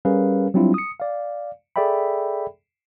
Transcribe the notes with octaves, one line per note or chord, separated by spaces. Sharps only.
G3 C#4 G#4 A#4 B4 F5
F#3 G3 C4 D4 E4 F4
D#6 C#7
D5 F5
G#4 A4 D5 E5 G5 B5